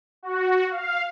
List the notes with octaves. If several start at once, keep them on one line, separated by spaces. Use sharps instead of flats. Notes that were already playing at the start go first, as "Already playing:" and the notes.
F#4
F5